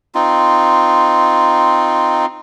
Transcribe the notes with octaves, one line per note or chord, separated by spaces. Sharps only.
C4 D#4 F4